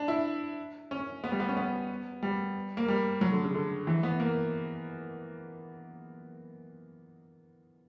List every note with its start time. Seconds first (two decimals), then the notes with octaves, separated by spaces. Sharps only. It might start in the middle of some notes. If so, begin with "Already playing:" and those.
Already playing: D4
0.08 E4
0.91 C#4
1.24 B3
1.32 G3
1.40 B3
1.49 C#4
1.57 B3
2.23 G3
2.77 A#3
2.88 G3
3.21 F#3
3.32 D3
3.44 C#3
3.54 D3
3.87 E3
4.03 B3
4.20 A#3